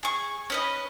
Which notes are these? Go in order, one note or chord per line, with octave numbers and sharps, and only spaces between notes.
G#4 C#6
C#4 B4 D#5